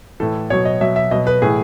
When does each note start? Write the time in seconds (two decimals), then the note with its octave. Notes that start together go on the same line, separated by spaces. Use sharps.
0.20 A2 E3 A4
0.50 B2 F#3 C#5
0.65 D#5
0.81 B2 F#3 E5
0.96 E5
1.11 B2 F#3 D#5
1.27 B4
1.42 A2 E3 G#4